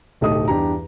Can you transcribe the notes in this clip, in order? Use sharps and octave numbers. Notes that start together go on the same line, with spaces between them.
D1 B1 A3 G4 D#5 D#6
E2 G2 D4 G4 A#5